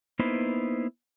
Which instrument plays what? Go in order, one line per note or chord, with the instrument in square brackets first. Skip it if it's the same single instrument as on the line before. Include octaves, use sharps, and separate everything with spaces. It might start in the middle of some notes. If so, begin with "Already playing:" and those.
[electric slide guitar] A#3 B3 D#4 E4 B4 C5